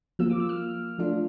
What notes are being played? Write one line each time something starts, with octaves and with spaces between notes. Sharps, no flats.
F3 A#3 F4 E6
D6
E6
F6
F3 A3 D4 F4